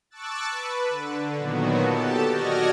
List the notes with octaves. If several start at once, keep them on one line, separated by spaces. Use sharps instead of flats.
A5 C#6 D6 E6 F#6 A6
B4
D3
A#2 D#3 F#3 B3 F#4
G4 A4 A5
F#4 D5 D#5 F6 G#6 A#6